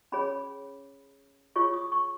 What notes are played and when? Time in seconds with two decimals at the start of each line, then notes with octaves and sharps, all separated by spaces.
0.12 C#4 G#4 C#5 B5
1.56 F4 G#4 C#5 C#6
1.74 D#6
1.92 C#6